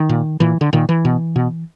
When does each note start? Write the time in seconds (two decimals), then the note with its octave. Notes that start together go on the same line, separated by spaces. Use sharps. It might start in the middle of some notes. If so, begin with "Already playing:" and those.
Already playing: D#3
0.09 A#2
0.40 A#2 E3
0.61 D3
0.73 A#2 D#3
0.89 E3
1.05 B2
1.36 B2